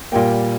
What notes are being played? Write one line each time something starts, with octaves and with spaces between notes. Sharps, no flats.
A#2 G3 A#3 G5